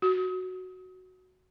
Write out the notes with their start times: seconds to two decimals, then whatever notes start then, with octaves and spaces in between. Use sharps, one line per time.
0.02 F#4